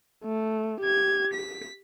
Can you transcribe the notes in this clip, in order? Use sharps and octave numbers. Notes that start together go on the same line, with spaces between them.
A3
G4 G#6
B6